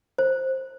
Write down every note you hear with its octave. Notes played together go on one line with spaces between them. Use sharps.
C5